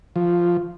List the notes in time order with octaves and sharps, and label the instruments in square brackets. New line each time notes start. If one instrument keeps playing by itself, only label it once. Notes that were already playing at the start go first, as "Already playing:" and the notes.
[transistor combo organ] F3